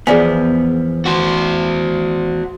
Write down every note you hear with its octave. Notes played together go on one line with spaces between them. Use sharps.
E2 F3 B3 G#4 D5 G#5
F#4 C5